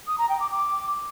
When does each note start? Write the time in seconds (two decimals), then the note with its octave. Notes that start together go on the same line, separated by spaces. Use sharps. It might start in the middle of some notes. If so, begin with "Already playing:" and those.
0.07 D#6
0.18 A#5
0.29 G5
0.40 D6
0.51 D6